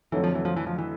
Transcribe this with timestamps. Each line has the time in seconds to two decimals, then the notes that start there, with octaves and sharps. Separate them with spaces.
0.12 F2 D3 E3 F#3 A3
0.24 F3
0.35 E3
0.45 F3
0.56 E3
0.67 F3
0.79 E3